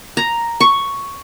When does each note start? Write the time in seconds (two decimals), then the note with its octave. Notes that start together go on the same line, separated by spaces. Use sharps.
0.17 A#5
0.60 C#6